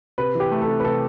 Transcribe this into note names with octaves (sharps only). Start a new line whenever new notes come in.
C3 B4
E3 G4
A3
A4
C3
B4
C3 A4